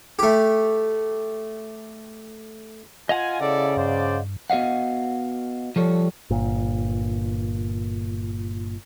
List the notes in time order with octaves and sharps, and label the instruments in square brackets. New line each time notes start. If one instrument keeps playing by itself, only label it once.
[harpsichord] A3 G4
[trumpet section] F4 G#5 [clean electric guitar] D#5 F5 F#5
[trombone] C#3 [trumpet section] E4 A4 D5
[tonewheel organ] G2 [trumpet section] C5 D5
[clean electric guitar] B3 F#4 D#5 F5 F#5
F3 G3 A4 C#5
[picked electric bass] G1 A#2